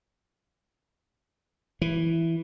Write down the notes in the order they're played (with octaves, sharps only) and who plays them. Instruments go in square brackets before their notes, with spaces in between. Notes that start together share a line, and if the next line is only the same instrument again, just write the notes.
[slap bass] E3